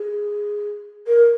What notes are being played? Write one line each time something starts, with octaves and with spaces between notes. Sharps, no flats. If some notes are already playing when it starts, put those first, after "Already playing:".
Already playing: G#4
A#4